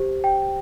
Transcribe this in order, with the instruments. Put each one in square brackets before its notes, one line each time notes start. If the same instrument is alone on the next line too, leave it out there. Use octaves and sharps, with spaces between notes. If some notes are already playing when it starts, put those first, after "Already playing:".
Already playing: [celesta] G4 C5
G5